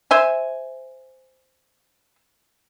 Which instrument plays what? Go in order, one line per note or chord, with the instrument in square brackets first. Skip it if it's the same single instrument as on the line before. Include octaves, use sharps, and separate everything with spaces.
[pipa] C5 E5 G#5